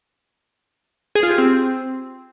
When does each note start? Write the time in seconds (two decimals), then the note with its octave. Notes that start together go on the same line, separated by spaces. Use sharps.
1.15 G#4
1.23 F4
1.31 G4
1.38 C4